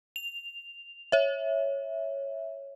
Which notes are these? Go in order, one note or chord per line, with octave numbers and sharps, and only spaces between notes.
F7
C#5 E5